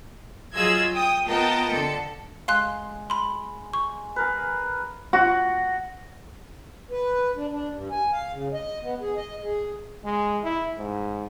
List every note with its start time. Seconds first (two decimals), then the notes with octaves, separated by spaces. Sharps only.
0.54 F#3 F4 G#4 D#5 E6 G#6
0.93 G5 D#6
1.25 B3 F4 A#4 D#5 G5 A5
1.71 D3 A4 C#7
2.48 G#3 F5 C6 F#6
3.10 B5 C6
3.73 C#6
4.16 G#4 A#4 B4
5.13 F#4
6.91 B4
7.35 D4
7.51 D4
7.73 G2
7.91 G#5
8.12 F5
8.32 C#3
8.53 D#5
8.83 B3
9.01 G#4
9.17 D#5
9.43 G#4
10.05 G#3
10.43 E4
10.78 G#2